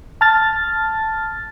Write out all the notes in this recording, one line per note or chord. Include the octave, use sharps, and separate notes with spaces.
A5 F6 A6